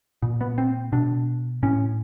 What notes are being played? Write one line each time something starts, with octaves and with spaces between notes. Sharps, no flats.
A#2
B3
C4
B2 D4
A2 C#4